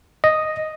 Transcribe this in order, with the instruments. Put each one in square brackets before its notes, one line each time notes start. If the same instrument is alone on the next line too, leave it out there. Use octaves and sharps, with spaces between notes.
[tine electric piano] D#5